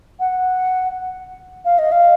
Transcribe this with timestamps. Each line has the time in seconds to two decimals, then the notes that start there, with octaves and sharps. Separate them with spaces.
0.20 F#5
1.65 F5
1.79 D#5
1.92 F5